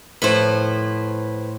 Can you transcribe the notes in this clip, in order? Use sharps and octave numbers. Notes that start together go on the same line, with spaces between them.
A2 F3 A3 B4 C5